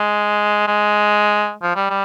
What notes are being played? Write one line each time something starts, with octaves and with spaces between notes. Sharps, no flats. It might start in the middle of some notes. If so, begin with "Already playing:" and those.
Already playing: G#3
G#3
F3
G3
G3